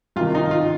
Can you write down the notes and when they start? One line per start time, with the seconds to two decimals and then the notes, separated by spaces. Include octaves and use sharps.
0.16 C2 C3 D#3 F4
0.35 D#4
0.51 F4